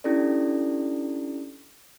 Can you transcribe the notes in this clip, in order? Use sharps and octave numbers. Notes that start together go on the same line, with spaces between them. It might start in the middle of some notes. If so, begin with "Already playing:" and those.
C#4 D4 E4 G4 A4 D5